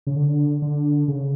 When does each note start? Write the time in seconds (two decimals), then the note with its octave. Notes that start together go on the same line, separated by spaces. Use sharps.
0.07 C#3
0.15 D3
0.62 D3
1.08 C#3